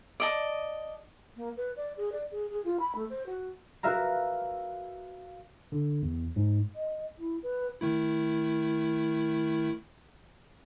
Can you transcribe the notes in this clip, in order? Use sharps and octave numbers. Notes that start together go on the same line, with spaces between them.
D5 D#5 A5
A#3
B4
D5
G#4
D5
G#4
G#4
F4
B5
A3
C5
F#4
F#4 A#4 B4 E5 F5 A#5
D3
E2
G#2
D#5
E4
B4
D#3 A3 E4